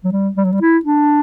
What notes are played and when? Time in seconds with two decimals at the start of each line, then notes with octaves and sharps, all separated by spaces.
0.04 F#3
0.12 G3
0.37 G3
0.45 F#3
0.53 G3
0.61 E4
0.85 D4